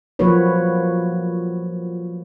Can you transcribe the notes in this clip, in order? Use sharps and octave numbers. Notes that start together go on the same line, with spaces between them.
F3 F#3 A#3 F#4 B4 C#5